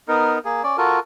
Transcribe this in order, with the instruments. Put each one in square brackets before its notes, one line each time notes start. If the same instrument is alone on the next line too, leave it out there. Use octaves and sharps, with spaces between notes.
[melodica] B3 D#4 A#4
A#3 G#4
C#4 D5
F4 F#4 A4 A#4